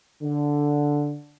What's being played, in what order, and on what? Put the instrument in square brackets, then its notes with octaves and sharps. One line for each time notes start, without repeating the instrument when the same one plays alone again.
[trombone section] D3